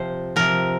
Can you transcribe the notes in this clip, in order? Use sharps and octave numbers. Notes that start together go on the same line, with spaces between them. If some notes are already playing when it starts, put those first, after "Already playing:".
Already playing: C3 F3 C5
C3 F3 A#4